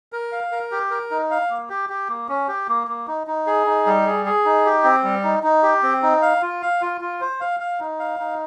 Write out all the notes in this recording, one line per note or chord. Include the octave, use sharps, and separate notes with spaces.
A#4
F5
A#4
G4
A#4
D#4
F5
A#3
G4
G4
A#3
C#4
G4
A#3
A#3
D#4
D#4
G#4
D#4
G3
G#4
G#4
D#4
G4
C4
G3
D#4
D#4
G4
C4
D#4
F5
F4
F5
F4
F4
C5
F5
F5
D#4
F5
D#4